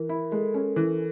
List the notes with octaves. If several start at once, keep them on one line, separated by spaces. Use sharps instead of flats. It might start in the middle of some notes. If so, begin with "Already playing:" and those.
Already playing: E3 A#4
E4
G#3 A4
C#4
E3